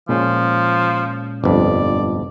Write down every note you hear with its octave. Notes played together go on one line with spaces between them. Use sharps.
A#2 F3 G#3 C#4
G1 F2 D5